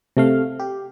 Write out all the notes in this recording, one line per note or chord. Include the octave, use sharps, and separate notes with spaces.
C3 A3 F5
G4